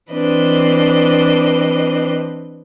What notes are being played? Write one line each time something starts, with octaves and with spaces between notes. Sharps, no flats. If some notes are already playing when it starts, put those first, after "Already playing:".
E3 C4 D4 B4 D#5